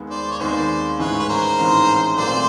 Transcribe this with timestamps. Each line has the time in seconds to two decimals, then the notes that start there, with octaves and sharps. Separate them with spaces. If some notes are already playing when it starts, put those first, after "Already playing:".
Already playing: D#2 D#3 G#3 B3
0.10 C5 D5
0.31 C#5
0.40 D#2 D#3 G#3 B3 C5 D5
0.99 A1 G#2 E3 G#3 C#4 B4 C#5
1.20 B4
1.29 A#4 C5
1.59 A1 G#2 E3 G#3 C#4
2.17 A#2 F#3 A3 C4 C5 D5